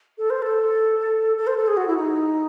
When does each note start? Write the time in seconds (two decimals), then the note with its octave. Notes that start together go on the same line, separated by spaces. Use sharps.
0.18 A4
0.30 C5
0.42 A4
1.37 A4
1.47 C5
1.57 A4
1.68 G#4
1.77 F#4
1.87 E4
1.97 D#4